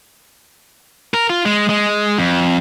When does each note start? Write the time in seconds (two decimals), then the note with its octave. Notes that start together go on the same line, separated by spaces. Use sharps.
1.14 A#4
1.30 F4
1.46 G#3
1.69 G#3
2.18 F2